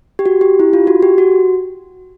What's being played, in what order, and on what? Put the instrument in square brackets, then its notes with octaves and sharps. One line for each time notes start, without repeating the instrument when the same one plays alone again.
[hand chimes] G4
F#4
G4
E4
F4
F#4
G4
F#4